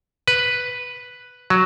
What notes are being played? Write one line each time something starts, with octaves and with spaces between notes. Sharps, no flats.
B4
F#3